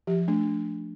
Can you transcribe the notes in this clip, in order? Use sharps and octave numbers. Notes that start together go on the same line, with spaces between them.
F3 G4
A3 D4